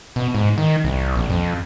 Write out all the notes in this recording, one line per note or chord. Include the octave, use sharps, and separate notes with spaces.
B2
G#2
D#3
C2
A#1
F2